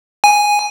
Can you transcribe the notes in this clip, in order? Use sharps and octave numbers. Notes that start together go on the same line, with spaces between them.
G#5